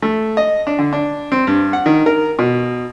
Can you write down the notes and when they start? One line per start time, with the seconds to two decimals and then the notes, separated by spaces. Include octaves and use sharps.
0.02 A3
0.37 D#5
0.67 D4
0.79 D3
0.93 D4
1.32 C4
1.47 G2
1.73 F#5
1.86 D#3
2.06 A#4
2.39 B2